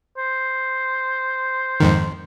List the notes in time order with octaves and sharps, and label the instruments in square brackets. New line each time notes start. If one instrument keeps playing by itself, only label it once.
[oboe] C5
[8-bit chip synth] F2 G#2 D#3